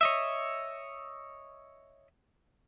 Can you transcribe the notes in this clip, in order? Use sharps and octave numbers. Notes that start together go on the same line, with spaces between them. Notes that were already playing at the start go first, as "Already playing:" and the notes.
C#5 D#5 E5